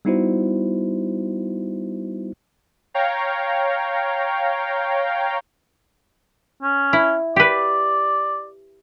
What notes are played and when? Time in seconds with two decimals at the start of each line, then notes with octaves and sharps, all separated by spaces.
0.05 G3 B3 D#4 E4 F#4 C5
2.94 C#5 F5 G5 A#5
6.63 C#4
6.93 E4
7.36 G4 B4 D5